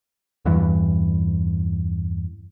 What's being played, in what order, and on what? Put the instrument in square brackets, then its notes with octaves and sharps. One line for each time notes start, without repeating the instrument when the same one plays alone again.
[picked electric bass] E2 G2 E3